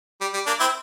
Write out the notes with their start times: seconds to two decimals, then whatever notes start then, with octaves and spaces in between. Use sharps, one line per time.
0.21 G3
0.34 G3
0.47 A#3 D4
0.60 C4 E4